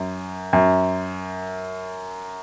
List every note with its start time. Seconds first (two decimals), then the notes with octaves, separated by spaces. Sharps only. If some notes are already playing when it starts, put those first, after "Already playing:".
Already playing: F#2
0.53 F#2